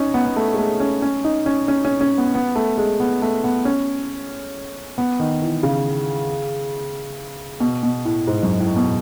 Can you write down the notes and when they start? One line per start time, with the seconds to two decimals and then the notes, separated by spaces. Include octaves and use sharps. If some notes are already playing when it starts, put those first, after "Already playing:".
Already playing: C#4 D#4
0.14 B3
0.26 B3
0.36 A3
0.54 G#3
0.58 A3
0.80 C#4
1.02 C#4
1.24 D#4
1.46 C#4
1.68 C#4
1.85 C#4
2.01 C#4
2.18 B3
2.35 B3
2.55 A3
2.78 G#3
3.00 B3
3.22 A3
3.44 B3
3.65 C#4
4.98 B3
5.20 D#3
5.42 E3
5.63 C#3
7.60 B2
7.83 B2
8.05 A2
8.27 G#2
8.43 F#2
8.60 A2
8.76 B2